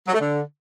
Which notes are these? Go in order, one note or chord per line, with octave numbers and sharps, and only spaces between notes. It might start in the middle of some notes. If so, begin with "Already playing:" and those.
F#3
A3
D3